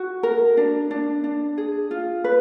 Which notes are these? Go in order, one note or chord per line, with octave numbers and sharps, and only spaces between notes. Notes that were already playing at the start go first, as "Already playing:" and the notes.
Already playing: F#4
A#4
D4
D4
D4
G#4
F4
B4